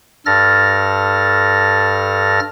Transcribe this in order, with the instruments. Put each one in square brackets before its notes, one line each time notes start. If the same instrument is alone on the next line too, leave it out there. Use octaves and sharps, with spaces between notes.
[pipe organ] G2 A4 F6 A6 A#6